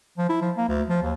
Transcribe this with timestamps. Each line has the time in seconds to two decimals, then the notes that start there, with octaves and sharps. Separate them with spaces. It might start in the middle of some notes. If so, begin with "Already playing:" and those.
0.18 F3
0.29 E4
0.41 F3
0.57 A#3
0.68 D2
0.89 F3
1.02 D#2